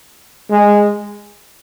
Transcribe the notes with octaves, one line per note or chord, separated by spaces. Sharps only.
G#3